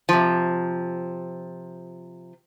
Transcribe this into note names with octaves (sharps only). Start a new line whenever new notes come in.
C3 F3